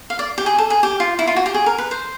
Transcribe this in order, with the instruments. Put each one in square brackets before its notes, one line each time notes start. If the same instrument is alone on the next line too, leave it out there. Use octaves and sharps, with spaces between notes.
[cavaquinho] F5
D5
G4
G#4
A4
G#4
G4
F4
E4
F4
F#4
G4
G#4
A#4
B4
C5